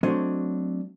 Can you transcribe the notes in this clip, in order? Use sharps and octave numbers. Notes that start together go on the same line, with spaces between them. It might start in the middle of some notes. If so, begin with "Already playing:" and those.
F#3 A3 C4 D4 C#5 D#5